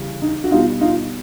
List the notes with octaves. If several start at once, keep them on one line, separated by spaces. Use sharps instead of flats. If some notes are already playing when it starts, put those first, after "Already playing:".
Already playing: C#3 E3 G3
D#4
F#4
B2 G3 B3 D#4 F4
D#4 F4